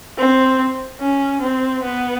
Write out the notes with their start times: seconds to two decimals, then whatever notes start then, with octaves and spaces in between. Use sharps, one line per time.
0.18 C4
1.01 C#4
1.42 C4
1.83 B3